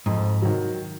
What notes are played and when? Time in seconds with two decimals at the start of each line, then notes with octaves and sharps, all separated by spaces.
0.06 F2 G#2
0.42 D#3 F#3